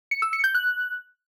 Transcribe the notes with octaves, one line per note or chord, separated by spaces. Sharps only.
C#7
E6
C#7
G6
F#6